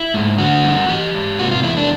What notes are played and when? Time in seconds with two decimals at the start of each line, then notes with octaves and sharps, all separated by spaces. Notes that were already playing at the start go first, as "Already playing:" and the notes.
Already playing: E4
0.14 G#2
0.38 D3 F#4
0.64 G2
0.89 E3 G4
1.14 G#2
1.39 C3 F#4
1.51 F4
1.63 E2 E4
1.77 D4